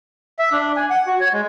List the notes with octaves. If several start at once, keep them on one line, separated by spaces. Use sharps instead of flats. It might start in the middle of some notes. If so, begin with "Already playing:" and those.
E5
D4
G#5
F#5
F#4
C#5
G#3